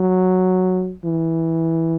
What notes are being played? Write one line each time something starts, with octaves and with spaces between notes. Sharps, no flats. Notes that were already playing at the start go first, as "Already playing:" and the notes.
Already playing: F#3
E3